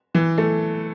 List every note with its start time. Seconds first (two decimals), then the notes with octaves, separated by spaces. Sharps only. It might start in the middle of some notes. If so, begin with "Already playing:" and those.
0.15 E3
0.38 A3